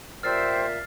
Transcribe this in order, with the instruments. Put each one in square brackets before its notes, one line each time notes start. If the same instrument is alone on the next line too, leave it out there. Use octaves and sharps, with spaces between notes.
[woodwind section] A#2 E5 [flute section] G4 C5 G5 [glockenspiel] F6 A6 C7